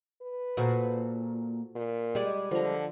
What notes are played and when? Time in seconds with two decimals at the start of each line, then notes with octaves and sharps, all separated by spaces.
0.22 B4
0.57 A#2 F#4 A4 C5
1.75 A#2
2.15 G3 G#3 G4 D5
2.51 D3 F3 A#5